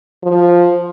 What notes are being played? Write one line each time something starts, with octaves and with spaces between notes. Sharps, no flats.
F3